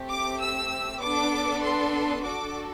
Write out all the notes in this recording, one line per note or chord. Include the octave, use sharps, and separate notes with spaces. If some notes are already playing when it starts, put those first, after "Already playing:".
Already playing: A3 C4 G4
D6
E6
B3 D4 A4 D6
C6
D4 F#4 A4 D6